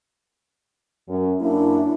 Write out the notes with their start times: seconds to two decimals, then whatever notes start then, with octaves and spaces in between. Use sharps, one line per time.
1.08 F#2
1.41 F#2 A#3 D4 E4